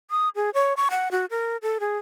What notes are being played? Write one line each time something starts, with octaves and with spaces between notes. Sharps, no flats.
D#6
G#4
C#5
C#6
F#5
F#4
A#4
A4
G#4